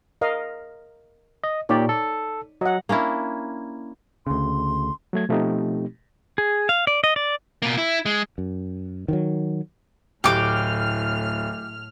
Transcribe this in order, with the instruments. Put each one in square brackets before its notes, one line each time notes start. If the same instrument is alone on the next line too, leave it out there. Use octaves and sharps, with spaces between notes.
[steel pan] A#4 D#5 F5
[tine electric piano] D#5
[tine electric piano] A#2 G4 [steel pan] D#4 C#5 D5
[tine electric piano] A4
[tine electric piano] F#3 [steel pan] D#5 F#5
[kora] A#3 C#4 D4 E4
[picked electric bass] D2 C#3 [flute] C6
[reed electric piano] F#3 A3 G#6
B2 F3 A3 C4 D#4 G4
[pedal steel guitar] G#4
F5
D5
D#5
D5
[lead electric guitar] B2 A#3
E4
G#3
[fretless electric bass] F#2
D#3 F3 F#3
[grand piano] D1 [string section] A2 F6 [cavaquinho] G4 D6